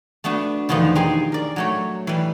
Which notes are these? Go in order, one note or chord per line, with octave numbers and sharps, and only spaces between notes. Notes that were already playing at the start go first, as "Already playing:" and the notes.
A3 B3 D4 F#4
E2 B2 D3 D#3 F3 F4
D#4 G4 G#4 G5 C6
A#4 D5
F#3 A3 C#5
E3 G3